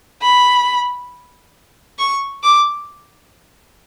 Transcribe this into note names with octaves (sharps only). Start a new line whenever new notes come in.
B5
C#6
D6